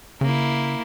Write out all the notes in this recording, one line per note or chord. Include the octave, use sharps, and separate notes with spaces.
C#3 A#3 E4